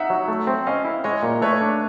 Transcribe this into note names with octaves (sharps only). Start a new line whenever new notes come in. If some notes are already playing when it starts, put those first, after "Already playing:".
Already playing: D#4 E5 F#5
F#3
A3
C4
C#4 D#5 F5
E4
G#3 C#5 D#5
A#2
A3 B4 C#5
D4